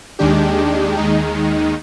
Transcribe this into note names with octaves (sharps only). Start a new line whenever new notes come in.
D#2 D#3 G#3 D4 G4
D#2 D#3 G#3 D#4